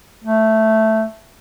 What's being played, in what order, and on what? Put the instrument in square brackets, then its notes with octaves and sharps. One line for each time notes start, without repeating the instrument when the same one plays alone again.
[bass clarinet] A3